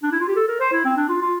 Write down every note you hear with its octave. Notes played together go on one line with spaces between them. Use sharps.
D4
E4
F4
G4
A4
A#4
C5
E4
C4
D4
F4
F4